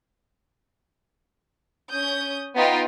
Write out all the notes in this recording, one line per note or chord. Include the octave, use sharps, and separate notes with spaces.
C#4 D#6 G6
B3 D#4 F4 G5